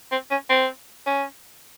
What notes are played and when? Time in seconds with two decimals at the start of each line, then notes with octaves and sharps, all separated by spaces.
0.12 C4
0.31 C#4
0.50 C4
1.07 C#4